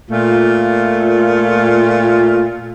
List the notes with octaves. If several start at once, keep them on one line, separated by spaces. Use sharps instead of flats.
A#2 A3 F4